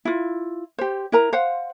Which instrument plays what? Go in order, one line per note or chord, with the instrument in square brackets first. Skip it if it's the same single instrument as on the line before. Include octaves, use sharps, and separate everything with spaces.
[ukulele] E4 F4
G4 C5
E4 A#4 A#5
C5 F5 F#5